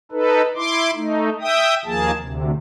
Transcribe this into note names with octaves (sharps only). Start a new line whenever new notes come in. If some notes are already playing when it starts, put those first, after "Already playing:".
D#4 A4 B4
E4 C6 D6
A3 D#4
E5 G5 D#6
D#2 F3 A#3 G#4 A5
D2 C3